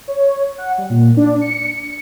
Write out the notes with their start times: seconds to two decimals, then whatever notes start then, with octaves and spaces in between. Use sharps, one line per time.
0.08 C#5
0.58 F#5
0.78 G3
0.90 A#2
1.17 D4
1.41 C#7